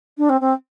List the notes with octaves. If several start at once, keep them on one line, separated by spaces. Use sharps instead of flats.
D4
C4
C4